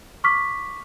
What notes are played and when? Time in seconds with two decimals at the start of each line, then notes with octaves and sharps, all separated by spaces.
0.24 C#6 D6 F6 B6